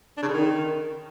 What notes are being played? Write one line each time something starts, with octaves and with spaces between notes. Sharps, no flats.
D4
C#3
D3
D#3